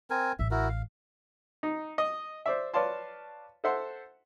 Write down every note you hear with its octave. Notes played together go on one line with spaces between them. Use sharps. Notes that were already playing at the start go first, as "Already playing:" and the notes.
C4 A#4 G#5
A1 E5
E4 F#4 A#4
F5
D#4
D#5
C5 D5 E5
B4 C#5 D5 F5 A5 C6
A4 C5 E5 F#5 C6